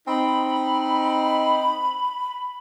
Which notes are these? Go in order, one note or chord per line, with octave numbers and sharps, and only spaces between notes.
C4 D#4 B5